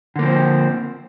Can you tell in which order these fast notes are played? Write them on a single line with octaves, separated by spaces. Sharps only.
D3 A#3 F3 C4